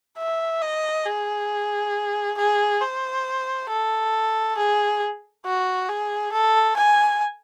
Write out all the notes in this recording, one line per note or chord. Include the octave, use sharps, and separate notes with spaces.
E5
D#5
G#4
G#4
C5
A4
G#4
F#4
G#4
A4
G#5